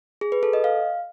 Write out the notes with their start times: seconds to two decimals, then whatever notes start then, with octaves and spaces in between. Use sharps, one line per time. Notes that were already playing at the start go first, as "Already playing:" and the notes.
0.21 G#4
0.32 B4
0.43 A4
0.53 D#5
0.64 F5